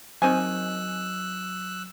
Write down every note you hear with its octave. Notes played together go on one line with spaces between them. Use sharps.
D#3 F#3 C4 C5 D#5 G#5 E6 F#6